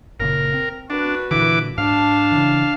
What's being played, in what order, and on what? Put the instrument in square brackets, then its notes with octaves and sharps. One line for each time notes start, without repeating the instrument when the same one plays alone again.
[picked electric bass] F#1 A#2 C#3 [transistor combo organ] A#4
[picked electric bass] C4
[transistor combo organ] D4 [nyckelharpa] F#4 B4
[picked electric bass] A#2 D3 [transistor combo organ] E3 D6
[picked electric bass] G#2 [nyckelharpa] D4 A5 [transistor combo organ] F5
[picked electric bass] C#3 E3